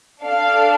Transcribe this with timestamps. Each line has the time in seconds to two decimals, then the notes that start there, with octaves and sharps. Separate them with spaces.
0.24 D4 A4 F5